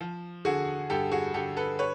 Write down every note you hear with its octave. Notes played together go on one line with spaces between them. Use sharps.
F3
D3 F#4 G#4
G2 G4 A4
F#4 G#4
D3 G4 A4
A4 B4
B4 C#5